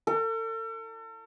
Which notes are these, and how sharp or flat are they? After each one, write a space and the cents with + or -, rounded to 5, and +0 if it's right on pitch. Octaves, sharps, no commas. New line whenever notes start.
A4 +40